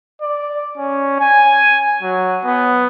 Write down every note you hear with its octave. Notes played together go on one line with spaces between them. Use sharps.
D5
C#4
G#5
F#3
B3